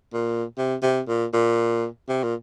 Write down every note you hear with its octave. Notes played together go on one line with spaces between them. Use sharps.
A#2
C3
C3
A#2
A#2
C3
A#2